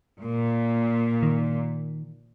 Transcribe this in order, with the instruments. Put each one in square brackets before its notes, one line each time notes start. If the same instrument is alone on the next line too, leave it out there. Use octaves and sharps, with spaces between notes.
[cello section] A#2
[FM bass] D#3